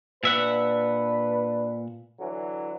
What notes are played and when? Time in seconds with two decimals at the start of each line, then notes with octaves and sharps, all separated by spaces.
0.23 A#2 D4 B4 E5 F#5
2.20 D3 E3 F#3